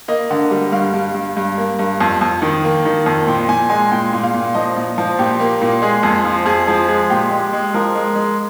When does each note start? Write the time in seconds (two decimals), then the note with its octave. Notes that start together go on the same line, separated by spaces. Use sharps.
0.08 A#3 D#5
0.31 D3
0.51 G3
0.72 G2 F5
0.94 G2
1.14 G2
1.37 G2
1.57 A#3
1.79 G2
2.01 F2
2.21 F2
2.42 D#3
2.64 A#3
2.85 D#3
3.06 F2
3.27 A#2 G5
3.49 A#2 G#5
3.70 G#3 G#5
3.92 A#2 G5
4.13 A#2
4.23 F5
4.34 A#2
4.54 F3 D#5
4.76 A#2
4.98 F3
5.19 A#2 G4
5.40 A#3
5.62 A#2
5.82 G#3 G#4
6.03 F2
6.24 F3
6.46 F2 G#4
6.67 F3 G#4
6.89 G#3 G#4
7.10 A#2 G4
7.31 G#3
7.53 G#3
7.74 F3 A#4
7.95 G#3
8.16 G#3